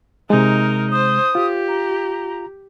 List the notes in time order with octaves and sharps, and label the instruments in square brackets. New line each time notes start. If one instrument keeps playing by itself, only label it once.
[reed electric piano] C3 G#3 [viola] D#4 A#4
[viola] C5 [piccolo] D#6
[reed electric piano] F4 [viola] G4
[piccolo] A#5